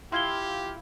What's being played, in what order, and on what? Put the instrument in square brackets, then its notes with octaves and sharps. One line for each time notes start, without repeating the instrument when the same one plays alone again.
[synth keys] E4 F4 F5 [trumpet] G4 [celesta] C6 G#6 G7